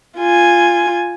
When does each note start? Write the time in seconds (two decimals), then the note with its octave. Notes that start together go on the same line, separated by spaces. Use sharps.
0.18 F4 G#5